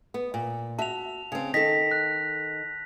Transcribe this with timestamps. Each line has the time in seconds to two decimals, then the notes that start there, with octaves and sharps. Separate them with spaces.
0.14 B3
0.34 A#2
0.79 F#4 E5 A5 F7
1.32 C#3 C4
1.54 D#3 A4 A#6 B6
1.91 F#6